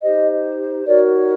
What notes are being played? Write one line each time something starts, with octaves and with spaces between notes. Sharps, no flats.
D#4 G4 C5 D#5
D#4 F#4 A#4 C#5 D5